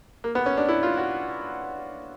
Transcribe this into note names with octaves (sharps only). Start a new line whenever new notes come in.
A#3
B3
C#4
D4
E4
F4
F#4